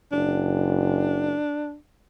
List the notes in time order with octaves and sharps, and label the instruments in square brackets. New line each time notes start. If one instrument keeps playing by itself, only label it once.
[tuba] F#1 [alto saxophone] D4